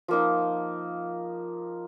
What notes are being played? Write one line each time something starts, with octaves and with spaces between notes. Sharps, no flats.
F3 A#3 D#4